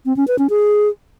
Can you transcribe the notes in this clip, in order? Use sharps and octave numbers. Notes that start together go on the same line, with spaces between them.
C4
C#4
B4
C#4
G#4